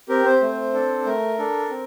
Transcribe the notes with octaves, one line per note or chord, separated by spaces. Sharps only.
C4 G4 A#4
C4 C5
A3
D4 A4
A3 A#4
D4 A4
C4